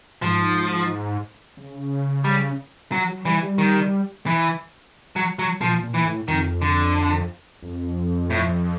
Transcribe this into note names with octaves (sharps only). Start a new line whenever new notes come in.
G#2 F3
C#3
G3
F#3
F#3
E3 G3
G3
D#3
E3
F#3
F#3
A#2 F3
A#2
E3
A2
F2 D#3
D3
F2
A2